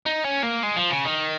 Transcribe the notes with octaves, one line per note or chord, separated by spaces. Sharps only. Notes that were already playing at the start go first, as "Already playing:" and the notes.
D#4
C#4
A#3
G#3
F3
C#3
D#3